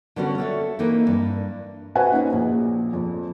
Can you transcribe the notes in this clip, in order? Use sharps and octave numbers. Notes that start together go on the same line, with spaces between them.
D3 G3 B3 C#4 D4 F#4
A4 C#5 E5
E3 A#3 C4 D#4
G2
F#4 B4 C5 E5 F#5 G#5
A#3 C#4 D#4 F#4
A#1 A#2
F2